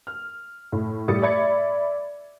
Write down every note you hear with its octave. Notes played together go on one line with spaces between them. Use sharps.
F6
A2
A2 G3 G4 D#6 A6 C#7
D5 E5 B5 G#6 A6 C#7